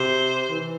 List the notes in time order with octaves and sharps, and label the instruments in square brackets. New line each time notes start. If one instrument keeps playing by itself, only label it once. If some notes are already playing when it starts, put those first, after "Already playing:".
Already playing: [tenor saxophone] C3 [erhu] C5
[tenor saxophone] E3